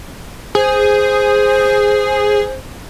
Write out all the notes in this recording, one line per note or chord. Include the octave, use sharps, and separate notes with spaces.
G#4 C5